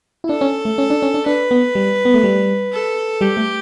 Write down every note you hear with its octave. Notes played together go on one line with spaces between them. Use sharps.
E4
D4 A4
C#4
A3
C#4
D4
C#4
D4
D4 B4
B3
G3
B3
A3
G3
A4
G3 G4
A3